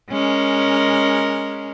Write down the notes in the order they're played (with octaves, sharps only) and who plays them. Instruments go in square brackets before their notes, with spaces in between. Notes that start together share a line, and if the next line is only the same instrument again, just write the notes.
[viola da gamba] G#3 C#4 A#4